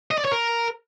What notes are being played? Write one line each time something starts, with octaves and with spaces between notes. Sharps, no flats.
D#5
D5
C#5
A#4